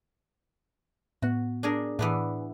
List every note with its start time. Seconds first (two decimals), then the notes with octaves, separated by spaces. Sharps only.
1.22 A2 B3 F#4
1.63 D4 G#4 A#4
1.99 A2 E3 B3 D4